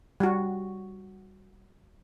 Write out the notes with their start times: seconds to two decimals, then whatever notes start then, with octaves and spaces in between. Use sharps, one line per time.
0.20 G3 F#4